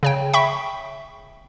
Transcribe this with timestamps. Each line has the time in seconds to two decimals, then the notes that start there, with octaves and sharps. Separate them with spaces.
0.03 C#3 C#5 G5
0.33 E5 G5 B5 C#6